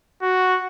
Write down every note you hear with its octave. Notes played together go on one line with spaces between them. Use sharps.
F#4